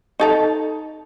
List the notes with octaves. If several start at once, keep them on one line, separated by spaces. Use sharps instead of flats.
D#4 A4 A#5